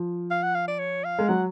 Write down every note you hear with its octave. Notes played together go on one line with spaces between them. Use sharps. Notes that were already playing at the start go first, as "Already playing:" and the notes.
Already playing: F3
F5
F#5
F5
D5
C#5
F5
G#3
F#3 F#5